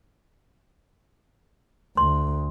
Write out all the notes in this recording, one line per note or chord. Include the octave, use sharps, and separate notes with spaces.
D2 C6